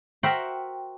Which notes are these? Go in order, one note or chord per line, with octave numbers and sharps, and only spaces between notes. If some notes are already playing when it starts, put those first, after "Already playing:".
F#4 A#4 C5 E5 F#5 G5